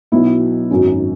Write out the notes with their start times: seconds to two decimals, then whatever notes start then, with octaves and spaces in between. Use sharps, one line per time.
0.12 B1 B2 F#3 B3 E4
0.71 G#1 F#2 F#3 C#4